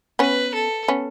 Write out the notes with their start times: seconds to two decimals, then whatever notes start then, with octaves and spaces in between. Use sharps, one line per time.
0.19 B3 C#4 B4
0.54 A4
0.88 B3 C#4